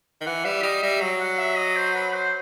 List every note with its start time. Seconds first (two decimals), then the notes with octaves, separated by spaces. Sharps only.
0.21 D#3
0.26 E3 F#5
0.45 G3 E5
0.63 G3 D#5
0.83 G3 E5
1.01 F#3
1.20 F#5
1.39 E5
1.57 D#5
1.76 C5
1.95 B4
2.14 C5